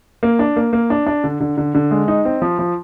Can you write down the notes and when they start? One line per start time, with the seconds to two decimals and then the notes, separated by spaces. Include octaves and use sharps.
0.23 A#3
0.39 D4
0.56 A#3
0.73 A#3
0.90 D4
1.06 D4
1.24 D3
1.40 D3
1.58 D3
1.75 D3
1.91 G#3
2.08 D#4
2.25 C4
2.42 F3
2.59 F3